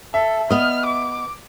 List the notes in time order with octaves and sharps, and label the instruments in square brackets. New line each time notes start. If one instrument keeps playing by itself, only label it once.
[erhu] A4 [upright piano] E5
[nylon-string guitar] B3 D#5 [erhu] F6
[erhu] D6